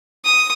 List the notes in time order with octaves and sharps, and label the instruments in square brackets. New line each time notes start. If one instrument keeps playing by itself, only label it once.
[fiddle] D#6